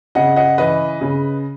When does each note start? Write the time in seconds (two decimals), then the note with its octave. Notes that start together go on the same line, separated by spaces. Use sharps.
0.15 C#3 D#5 F#5
0.36 D#5 F#5
0.58 E3 B4 D#5
1.01 C#3